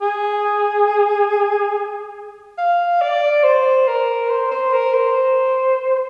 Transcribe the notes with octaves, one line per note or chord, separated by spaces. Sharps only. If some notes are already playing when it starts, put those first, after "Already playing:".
G#4
F5
D5
C5
A#4
C5
C5
A#4
C5